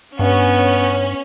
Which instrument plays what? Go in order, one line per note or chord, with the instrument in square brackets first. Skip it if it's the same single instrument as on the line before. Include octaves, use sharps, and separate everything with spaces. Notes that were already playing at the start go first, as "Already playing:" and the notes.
[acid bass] G2 [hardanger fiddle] B3 [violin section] C#4